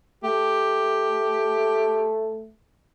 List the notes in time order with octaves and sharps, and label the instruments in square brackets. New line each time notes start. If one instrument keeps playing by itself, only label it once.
[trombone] A3 [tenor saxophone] G4